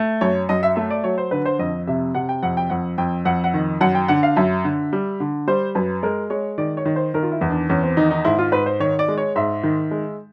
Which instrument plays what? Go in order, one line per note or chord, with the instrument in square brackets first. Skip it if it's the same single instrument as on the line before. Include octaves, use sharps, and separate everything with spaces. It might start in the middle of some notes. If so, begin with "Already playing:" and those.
Already playing: [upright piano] A3
F#2 C#5
F#2 D#5
E5
A3 E5
D5
F#3 C#5
C5
D3 B4
C5
F2 D#5
C3 E5
C3 F#5
G5
F2 F#5
G5
F2 F#5
F2 G5
F2 F#5
F#5
D#3
F#2 F#5
G5
D3 F#5
F5
F#2 E5
D3
G3
D3
G3 C5
F#2 B4
G#3 A#4
G#3 C#5
D#3 D5
C#5
D#3
C5
D#3 A#4
F4
E4
E2
D4
E2 C#4
C4
D#3 D#4
D#4
G#2 E4
F4
G#2 B4
C5
D#3 C#5
D5
G#3
C#5
G#2 E5
D#3
G#3